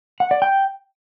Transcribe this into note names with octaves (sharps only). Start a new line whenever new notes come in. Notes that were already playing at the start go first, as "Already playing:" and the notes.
F#5
D5
G5